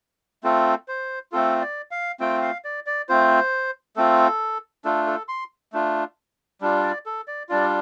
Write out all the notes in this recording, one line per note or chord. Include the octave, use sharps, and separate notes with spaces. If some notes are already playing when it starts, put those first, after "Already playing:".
A3 C4 F4 A4
C5
A3 C4 F4 A4
D5
F5
A3 C4 F4 G5
F5
D5
D5
A3 C4 F4 C5
A3 C4 F4 A4
A3 D4 F4 A4
A4
C6
A3 D4 F4
G3 D4 F4
D5
A4
D5
G3 D4 F4 D5